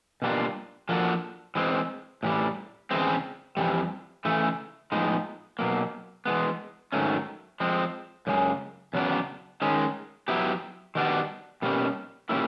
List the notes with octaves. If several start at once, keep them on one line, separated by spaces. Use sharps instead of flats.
B2 G3 A#3 D4 F4
F3 A#3 D4 F#4 A4
E3 G#3 C4
A2 E3 G3
E2 C#3 E3 G#3 C4
F2 C3 E3 G3
C#3 E3 A3
A2 F3 G#3 B3 D#4
B2 F#3 A#3
E3 G#3 B3
G#2 D#3 F#3 A3 C#4
F3 G#3 C4
F#2 C#3 G#3
E2 C#3 F#3 B3 D4
D#3 G#3 C#4
F#3 B3 E4 G4
D#3 G3 B3 D4 F#4
B2 G3 A#3 C#4
A#2 G3 A#3 C#4 E4